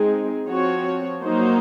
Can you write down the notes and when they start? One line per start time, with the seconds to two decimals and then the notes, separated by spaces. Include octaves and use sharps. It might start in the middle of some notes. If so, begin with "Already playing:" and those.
Already playing: G#3 C4 D#4 G#4
0.46 F3 C4 F#4 C#5
1.21 F#3 A#3 D#4 F#4 C5